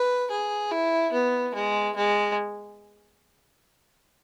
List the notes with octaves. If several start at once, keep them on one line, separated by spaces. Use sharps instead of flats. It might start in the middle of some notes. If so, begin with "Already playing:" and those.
Already playing: B4
G#4
E4
B3
G#3
G#3